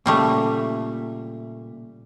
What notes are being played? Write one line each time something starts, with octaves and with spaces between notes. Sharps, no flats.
A#2 C#3 G3 A3 E5